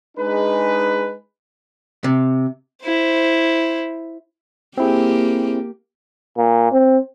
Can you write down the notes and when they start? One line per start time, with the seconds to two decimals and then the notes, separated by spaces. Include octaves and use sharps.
0.18 G#3 D4 D#4 G#4 B4
2.04 C3
2.85 E4 C5
4.78 A#3 C4 E4 G4 G#4
6.38 A#2
6.72 C4